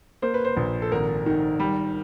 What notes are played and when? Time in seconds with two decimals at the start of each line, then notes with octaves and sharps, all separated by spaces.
0.22 A#3 C5
0.34 B4
0.45 C5
0.57 A#1
0.82 A4
0.92 G#1 A#4
1.26 D#3
1.60 G3